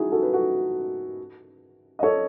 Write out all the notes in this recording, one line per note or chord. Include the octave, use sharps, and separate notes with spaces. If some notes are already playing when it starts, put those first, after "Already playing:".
Already playing: C#4 D#4 E4 F#4 G#4
F#4 A4
B4
F#4 A4
D#5
A4 C#5